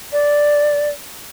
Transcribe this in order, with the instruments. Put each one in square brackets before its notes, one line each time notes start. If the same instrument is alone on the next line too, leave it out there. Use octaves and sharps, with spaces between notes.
[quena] D5